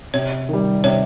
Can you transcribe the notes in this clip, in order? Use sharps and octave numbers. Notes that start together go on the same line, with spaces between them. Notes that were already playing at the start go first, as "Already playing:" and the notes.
C3 C#5
D#3 G3
C3 C#5